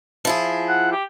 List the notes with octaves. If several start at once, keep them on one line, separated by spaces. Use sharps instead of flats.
F3 E4 G#4
F#5
G4